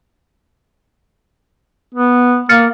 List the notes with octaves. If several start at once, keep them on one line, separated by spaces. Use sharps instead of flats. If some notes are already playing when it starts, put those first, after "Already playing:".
B3
A#3 F6 A6 C#7